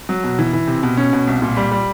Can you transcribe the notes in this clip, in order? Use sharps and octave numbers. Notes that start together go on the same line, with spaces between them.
F#3
B2
E3
E3
C3
B2
C#4
B2
C2
A#2
G3
G3